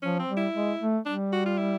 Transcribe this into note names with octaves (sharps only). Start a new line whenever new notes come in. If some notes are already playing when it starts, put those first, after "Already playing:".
F3 C#4
C4
G3
E4
G#3
A3
G3 D4
F#4
F4
E4